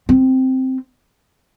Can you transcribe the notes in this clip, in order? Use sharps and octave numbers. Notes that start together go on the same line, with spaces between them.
C4